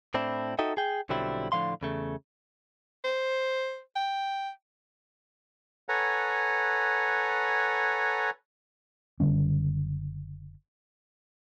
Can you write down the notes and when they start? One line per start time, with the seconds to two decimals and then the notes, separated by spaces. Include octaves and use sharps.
0.14 A2 C4 D4 E4
0.59 D#4 F#4 A4 D#5 E5 G5
0.77 G#4 G5
1.09 B1 D3 F#3 G3 C4 E4
1.52 A2 D3 F3 F5 C6
1.81 E2 C#3 A3
3.05 C5
3.96 G5
5.89 A4 B4 C#5 F#5 G#5 A#5
9.20 F#1 D3 G3 C#4